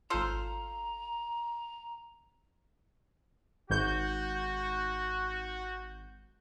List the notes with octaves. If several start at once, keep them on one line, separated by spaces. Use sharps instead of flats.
G#1 F4 A4 C5 A#5 F6 E7
G#1 F#4 G6